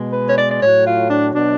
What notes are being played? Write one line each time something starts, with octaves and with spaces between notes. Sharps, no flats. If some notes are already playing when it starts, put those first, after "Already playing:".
Already playing: B2 G#3
B4
C#5
D5
D5
A2 F#3 C#5
F4
D4
B2 F#3 D4